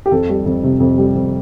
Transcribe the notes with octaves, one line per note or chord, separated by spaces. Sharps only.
G4
F2 A4
G3
F2
C3
F2
G3
F2